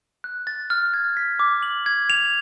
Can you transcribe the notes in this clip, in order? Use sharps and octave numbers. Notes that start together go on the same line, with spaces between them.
F#6
A6
F6
G#6
B6
D6
F#7
G#6
F7